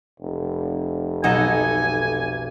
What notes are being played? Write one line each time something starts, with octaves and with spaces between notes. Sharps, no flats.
F1
B1 D#4 A4 D#5 F#5 G#5 G6